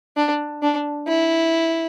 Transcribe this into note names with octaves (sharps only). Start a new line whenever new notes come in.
D4
D4
E4